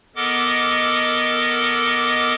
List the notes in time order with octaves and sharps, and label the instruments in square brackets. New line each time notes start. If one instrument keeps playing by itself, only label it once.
[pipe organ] B3 A4 A#4 D#5 F#5 D6